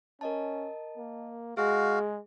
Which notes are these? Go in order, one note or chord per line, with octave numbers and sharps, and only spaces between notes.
C#4 A#4 D#5 A5
A#3
G#3 F#4 G#4 F5